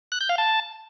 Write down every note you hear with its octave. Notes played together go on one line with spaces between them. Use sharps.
F#6
G6
F5
A5